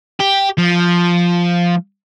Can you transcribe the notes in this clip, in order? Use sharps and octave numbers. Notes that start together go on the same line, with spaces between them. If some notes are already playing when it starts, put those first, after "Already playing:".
G4
F3